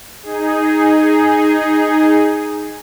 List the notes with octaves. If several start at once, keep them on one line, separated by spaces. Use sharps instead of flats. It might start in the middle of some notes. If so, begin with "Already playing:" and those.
D#4 G#4